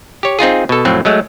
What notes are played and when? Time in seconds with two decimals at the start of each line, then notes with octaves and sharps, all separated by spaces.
0.23 G4 C#5
0.39 C4 D#4 F4 G#4
0.69 B2 A4
0.85 F2 A2 F#3 C4
1.05 F#3 G#3 A3